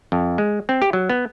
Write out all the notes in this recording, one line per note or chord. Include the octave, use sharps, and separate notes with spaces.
F2
G#3
C4
G4
F#3
B3